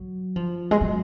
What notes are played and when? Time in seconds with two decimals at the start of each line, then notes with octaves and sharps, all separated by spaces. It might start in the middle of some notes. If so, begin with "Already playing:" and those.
Already playing: F#3
0.36 F3
0.71 G#3
0.81 F#3